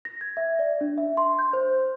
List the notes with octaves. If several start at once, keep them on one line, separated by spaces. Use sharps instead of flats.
A#6
G#6
E5
D5
D4
E5
C6
G6
C5